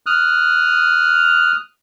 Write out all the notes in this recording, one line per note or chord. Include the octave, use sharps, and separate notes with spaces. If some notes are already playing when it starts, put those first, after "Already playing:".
D#6 F6 F#6